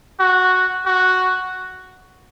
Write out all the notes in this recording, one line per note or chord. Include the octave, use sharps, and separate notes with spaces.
F#4
F#4